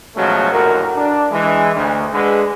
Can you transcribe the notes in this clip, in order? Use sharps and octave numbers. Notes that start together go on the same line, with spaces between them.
B2 F3 F#3 G#3 A3 C#4
A#1 D#2 A2 F#4 A#4
D4
E3 G#3
D2
D3 G#3 B4